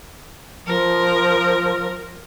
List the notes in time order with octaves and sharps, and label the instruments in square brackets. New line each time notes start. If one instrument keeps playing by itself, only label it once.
[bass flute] F3 [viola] A#4